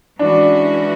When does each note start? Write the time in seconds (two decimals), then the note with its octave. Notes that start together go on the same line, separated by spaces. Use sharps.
0.19 E3 G#3 C#4 D4 F#4